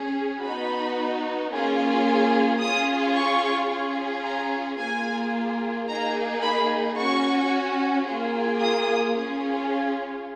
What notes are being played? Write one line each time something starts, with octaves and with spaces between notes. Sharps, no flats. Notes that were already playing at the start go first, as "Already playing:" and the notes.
Already playing: C#4 G#4
B3 D#4 F#4 B5
A#3 C#4 F4 G#4
C#4 F4 G#4 D#6
C#6
C#4 F4 G#4
A#5
A#3 F4 G#4 G#5
A#3 D#4 G#4 A#5
B5
C#4 F#4 C#6
A#3 F4 G#4
D#6
C#4 F4 G#4